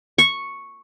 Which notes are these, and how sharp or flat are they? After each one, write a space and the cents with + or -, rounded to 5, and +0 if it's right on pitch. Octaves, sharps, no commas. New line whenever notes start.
C#6 -5